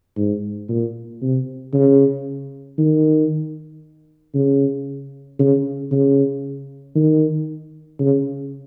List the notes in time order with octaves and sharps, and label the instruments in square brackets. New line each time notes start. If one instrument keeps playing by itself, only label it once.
[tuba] G#2
A#2
C3
C#3
D#3
C#3
C#3
C#3
D#3
C#3